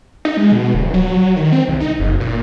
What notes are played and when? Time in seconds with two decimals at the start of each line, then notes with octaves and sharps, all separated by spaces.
0.25 D#4
0.37 G#3
0.52 B2
0.74 D1
0.94 F#3
1.36 D#3
1.52 C4
1.68 C2
1.80 D#4
1.99 F#1
2.20 A#2